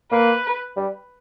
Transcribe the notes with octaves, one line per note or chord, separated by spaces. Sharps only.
A#3 B4
G3